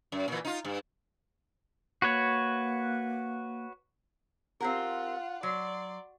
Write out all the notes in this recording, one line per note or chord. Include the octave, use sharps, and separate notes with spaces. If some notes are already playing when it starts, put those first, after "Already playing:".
F#2
A#2 E3
D#4 F4
G2
A#3 F#4 B4 C#5
C4 F4 G4 A#4 F#5
F#3 D5 C6